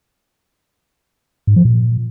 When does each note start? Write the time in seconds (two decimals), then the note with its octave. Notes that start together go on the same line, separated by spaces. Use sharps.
1.47 G#2
1.56 F3
1.65 A#2